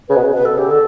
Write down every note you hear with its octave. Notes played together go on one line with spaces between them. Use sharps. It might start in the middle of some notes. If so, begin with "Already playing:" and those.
C#3 B4
B2
C#3
B2 B4
B2 A4
C#3 G4
D3 A4